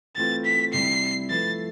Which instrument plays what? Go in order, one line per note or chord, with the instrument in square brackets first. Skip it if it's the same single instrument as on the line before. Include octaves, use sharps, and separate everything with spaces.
[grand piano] E3 A3 C4 F4 B4 [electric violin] A6
[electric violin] B6
[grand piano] C3 G3 C4 E4 [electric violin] C7
[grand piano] F3 A3 E4 B4 [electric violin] A6